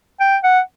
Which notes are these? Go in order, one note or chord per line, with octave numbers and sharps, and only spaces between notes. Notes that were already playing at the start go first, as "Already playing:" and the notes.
G5
F#5